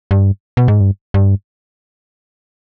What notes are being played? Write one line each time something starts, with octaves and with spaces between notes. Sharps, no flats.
G2
B2
G#2
G2
G2